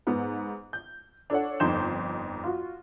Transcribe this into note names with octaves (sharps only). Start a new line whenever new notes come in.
G#2 B3
G6
D4 A4 C#5 F#5
G1 F2 D#4 C6 G6 E7
F4 F#4